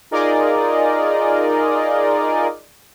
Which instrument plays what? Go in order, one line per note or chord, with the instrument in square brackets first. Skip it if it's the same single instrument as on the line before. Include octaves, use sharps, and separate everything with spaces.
[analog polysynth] D#4 F4 G#4 A#4 D5 D#5